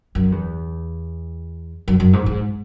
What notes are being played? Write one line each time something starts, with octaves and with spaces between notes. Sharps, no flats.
F#2
E2
F#2
F#2
G#2
G#2